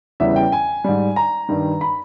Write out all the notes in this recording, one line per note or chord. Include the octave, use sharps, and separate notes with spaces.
E2 C#3 E3 G3 E5
G5
G#5
G#2 G3
A#5
G2 D#3 G3
B5